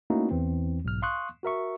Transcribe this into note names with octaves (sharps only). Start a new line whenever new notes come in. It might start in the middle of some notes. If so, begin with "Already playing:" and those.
A3 A#3 C#4 D#4 E4 F#4
E2 E3 C4
B1 G#2 F6
F5 C6 C#6 D#6 F#6
F#4 A#4 E5 C#6